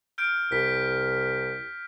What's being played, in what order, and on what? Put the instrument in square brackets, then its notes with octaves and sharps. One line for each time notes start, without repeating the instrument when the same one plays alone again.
[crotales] F6 G6 D7
[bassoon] C2 [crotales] B6